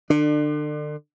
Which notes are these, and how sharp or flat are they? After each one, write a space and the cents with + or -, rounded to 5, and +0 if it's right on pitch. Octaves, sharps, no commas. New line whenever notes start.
D3 +35 D4 +30